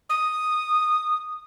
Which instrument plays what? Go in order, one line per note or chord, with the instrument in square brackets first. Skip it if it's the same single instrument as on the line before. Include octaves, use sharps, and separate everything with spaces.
[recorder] D#6